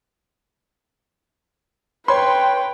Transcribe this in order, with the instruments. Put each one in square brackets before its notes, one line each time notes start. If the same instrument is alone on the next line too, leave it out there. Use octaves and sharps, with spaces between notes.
[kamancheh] B4 G5 [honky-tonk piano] C#5 C6